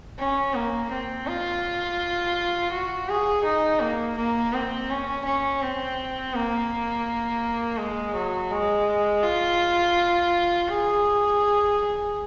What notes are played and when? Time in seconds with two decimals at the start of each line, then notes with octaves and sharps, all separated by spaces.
0.18 C#4
0.55 A#3
0.91 C4
1.27 F4
2.72 F#4
3.08 G#4
3.44 D#4
3.80 A#3
4.17 A#3
4.53 C4
4.90 C#4
5.25 C#4
5.62 C4
6.34 A#3
7.79 G#3
8.15 F#3
8.51 G#3
9.23 F4
10.68 G#4